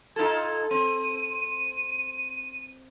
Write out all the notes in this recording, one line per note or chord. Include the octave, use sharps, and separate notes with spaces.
D#4 F4 A4 G#6
C4 D#7